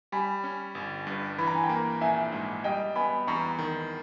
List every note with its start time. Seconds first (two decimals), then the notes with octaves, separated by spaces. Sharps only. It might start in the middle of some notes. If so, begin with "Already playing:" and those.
0.12 G3 G#5 B5
0.44 C#4
0.75 G1
1.07 G2
1.38 E3 B5
1.47 A#5
1.55 G#5
1.64 G5 A#5
1.69 A#3
2.01 A#1 E5 G#5
2.32 G#2
2.64 G3 D#5 G5
2.96 B3 G#5 B5
3.27 E2 A#5 C#6
3.59 D#3